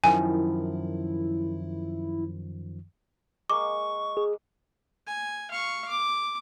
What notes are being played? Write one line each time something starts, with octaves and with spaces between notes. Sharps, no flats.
F#2 D#3 F3 E4 G#5
G#3 A#3 C#6 D6
G#4
G#5
F5 C#6
D6